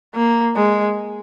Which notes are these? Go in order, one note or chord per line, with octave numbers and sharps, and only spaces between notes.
A#3
G#3